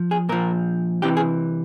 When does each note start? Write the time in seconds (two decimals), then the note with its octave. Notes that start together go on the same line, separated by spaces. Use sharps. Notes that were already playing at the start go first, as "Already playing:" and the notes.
Already playing: F3
0.11 G#4
0.29 A#2 F3 A#4
1.02 C3 E3 G4
1.17 G#4